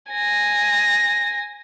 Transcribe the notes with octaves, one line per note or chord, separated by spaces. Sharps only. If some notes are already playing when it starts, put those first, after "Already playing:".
G#5 A#6